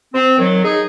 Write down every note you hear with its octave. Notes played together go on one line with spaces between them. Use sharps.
C4
D#3 F#3
D#4 G#4